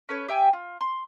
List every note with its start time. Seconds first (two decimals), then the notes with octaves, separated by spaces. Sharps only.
0.09 C#4 A4 B4 C#5
0.28 G4 E5 G5 G#5
0.53 F4
0.81 C6